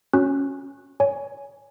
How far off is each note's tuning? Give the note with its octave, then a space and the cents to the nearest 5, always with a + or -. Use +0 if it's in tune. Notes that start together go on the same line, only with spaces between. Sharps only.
C#4 +0 F#4 -30
C#5 +25 G#5 +0